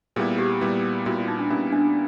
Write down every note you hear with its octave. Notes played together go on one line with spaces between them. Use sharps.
A#2 G3 B3 E4 G#4
G4
A#2 G3 B3 E4
A#2 G3 B3 E4 F#4
F4
D#4
D4
A#2 G3 B3 C#4 E4
D4